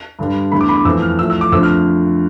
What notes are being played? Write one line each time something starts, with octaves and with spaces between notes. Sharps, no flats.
G2 D3 G3
E2 D3 A3 B5
D6
B5
D6
F2 E3 A3 E6
F6
A2 F3 A3 E6
E6
D6
F2 D3 F3 A3 E6
F6